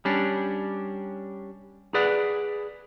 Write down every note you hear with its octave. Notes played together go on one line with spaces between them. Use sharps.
G3 C#4 D4
G#4 B4 D5 F#5